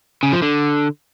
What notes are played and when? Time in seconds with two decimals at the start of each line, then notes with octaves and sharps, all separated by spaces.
0.23 C#3
0.33 F3
0.42 D3